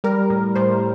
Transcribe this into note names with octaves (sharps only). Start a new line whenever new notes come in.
G3 A#4
A2
A2 C5